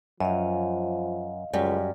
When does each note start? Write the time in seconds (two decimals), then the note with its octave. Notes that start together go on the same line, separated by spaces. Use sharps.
0.20 F#2 F3 D#5 F5
1.53 C#2 F#2 G3